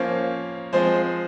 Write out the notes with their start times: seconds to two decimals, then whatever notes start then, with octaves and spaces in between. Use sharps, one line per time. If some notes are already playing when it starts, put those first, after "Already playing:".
Already playing: F3 A#3 C#4 C5
0.73 F3 G#3 C4 C5